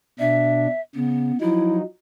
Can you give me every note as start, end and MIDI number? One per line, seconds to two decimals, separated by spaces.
0.20 0.67 47
0.20 0.67 62
0.20 0.81 76
0.95 1.32 49
0.95 1.38 59
1.41 1.82 53
1.41 1.82 54
1.41 1.82 63
1.41 1.76 64